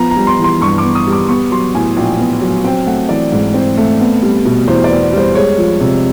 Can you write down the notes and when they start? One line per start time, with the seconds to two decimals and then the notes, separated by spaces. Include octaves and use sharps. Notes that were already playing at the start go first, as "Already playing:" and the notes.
Already playing: F3 B3 A#5
0.11 A#5
0.16 G3
0.27 C6
0.39 E3
0.44 C6
0.61 G2 C#6
0.78 D6
0.84 B3
0.95 D#6
1.07 G3
1.12 D6
1.29 B3 C#6
1.51 F#3 C6
1.75 A2 G#5
1.97 A#1 G5
2.19 B3
2.42 F#3
2.64 C4 G5
2.87 A3 F#5
3.09 E3 D5
3.32 G#2
3.54 C4
3.78 A3
4.00 B3
4.23 G3
4.45 B2
4.68 E2 C5
4.84 D5
4.91 B3
5.13 G3 C5
5.35 G#3 C#5
5.58 F3
5.81 C3